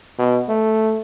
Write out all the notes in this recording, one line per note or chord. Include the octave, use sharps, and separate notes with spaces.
B2
A3